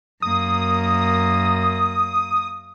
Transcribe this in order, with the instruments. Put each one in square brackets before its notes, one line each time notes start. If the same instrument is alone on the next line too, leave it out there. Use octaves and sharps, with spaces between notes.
[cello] F#2 A#3 [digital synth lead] D#6